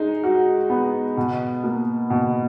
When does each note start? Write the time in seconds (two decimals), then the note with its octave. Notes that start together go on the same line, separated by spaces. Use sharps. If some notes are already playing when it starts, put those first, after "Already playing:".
Already playing: G#3 D#4
0.24 F#4
0.70 B3
1.17 B2
1.64 A#3
2.10 B2